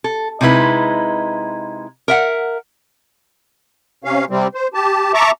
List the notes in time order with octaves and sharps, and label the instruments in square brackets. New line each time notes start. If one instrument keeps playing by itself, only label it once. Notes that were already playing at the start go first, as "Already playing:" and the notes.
[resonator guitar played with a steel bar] A4
C3 G#3 D#4 E4 B4
A#4 E5 F#5
[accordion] C3 C#4 F5
C3 G3 C4
C5
G4 A5
E5 A5 A#5 C#6 D6